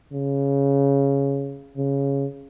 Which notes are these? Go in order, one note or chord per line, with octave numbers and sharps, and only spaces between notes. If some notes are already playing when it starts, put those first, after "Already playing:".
C#3
C#3